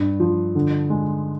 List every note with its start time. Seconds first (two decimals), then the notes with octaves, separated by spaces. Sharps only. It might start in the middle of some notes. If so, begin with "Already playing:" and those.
Already playing: G2
0.20 F3
0.55 D3
0.90 G#3